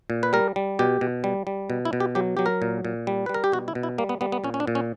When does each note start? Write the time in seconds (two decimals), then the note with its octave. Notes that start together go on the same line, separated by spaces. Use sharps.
0.10 A#2
0.23 B4
0.33 G3 A#4
0.56 G3
0.79 B2 G4
1.01 B2
1.24 G3
1.47 G3
1.70 B2
1.85 E4
1.93 B2
2.00 G4
2.15 F#3 G4
2.37 F#3 G4
2.46 A#4
2.62 A#2
2.85 A#2
3.07 G3
3.26 G3 B4
3.34 A#4
3.44 G4
3.52 B2 F#4
3.68 E4
3.75 B2
3.83 E4
3.98 G3 A#3
4.09 B3
4.21 G3 B3
4.32 B3
4.44 A#2 C#4
4.54 C#4
4.60 D4
4.67 A#2
4.75 C#4